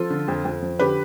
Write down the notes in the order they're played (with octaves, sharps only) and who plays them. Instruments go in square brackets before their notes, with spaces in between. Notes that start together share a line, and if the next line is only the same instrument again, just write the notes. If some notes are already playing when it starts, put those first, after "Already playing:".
Already playing: [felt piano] F3 F4 A4
D3
F2
F2
F3
D3 G4 B4